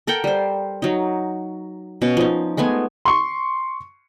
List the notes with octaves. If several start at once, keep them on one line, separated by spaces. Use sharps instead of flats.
A4 A#4 F#5 G5
G3 C5
F#3 D#4
B2 C#4
F3 D#4
G#3 A3 B3 G#5
C6 C#6